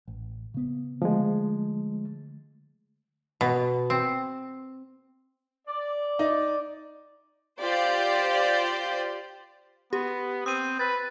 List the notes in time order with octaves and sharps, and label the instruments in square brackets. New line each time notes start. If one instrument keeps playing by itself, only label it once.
[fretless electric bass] A1
C#3 B3
[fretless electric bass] D3 A3 [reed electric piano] F3 G#3
[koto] B2
C4
[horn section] D5
[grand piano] D#4
[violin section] F4 G4 C5 D5 C6 G6
[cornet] B3 [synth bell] G4
[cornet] C4 [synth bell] D#6 D#7
[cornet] B4 [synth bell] A6